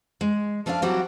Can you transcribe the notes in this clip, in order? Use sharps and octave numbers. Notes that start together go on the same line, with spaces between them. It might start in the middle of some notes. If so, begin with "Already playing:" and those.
G#3
F3 A3 D4 D5 F5
E3 F#3 G3 C4 F#4 G4